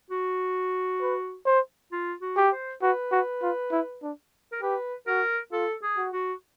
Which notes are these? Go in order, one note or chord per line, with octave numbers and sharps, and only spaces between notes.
F#4
B4
C5
F4
F#4
G4
C5
F#4 B4
F#4
F4
E4
D4
A#4
G4 B4
F#4 A#4
F4 A4
G#4
F#4
F#4